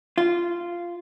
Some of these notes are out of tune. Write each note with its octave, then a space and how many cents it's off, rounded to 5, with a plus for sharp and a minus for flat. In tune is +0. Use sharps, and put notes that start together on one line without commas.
F4 -10